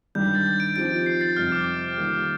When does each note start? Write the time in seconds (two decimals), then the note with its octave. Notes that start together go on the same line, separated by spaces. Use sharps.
0.15 G2 D#3 G3 D4 G6
0.26 G6
0.35 A6
0.46 A6
0.60 D7
0.76 F3 C4 D#4 G4 D7
1.06 C7
1.21 A6
1.36 F2 C3 G3 C4 F6
1.52 D6
1.97 D#3 G3 A#3